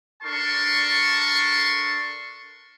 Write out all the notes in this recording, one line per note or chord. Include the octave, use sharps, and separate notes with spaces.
D4 A4 A#4 A5 C6 C#6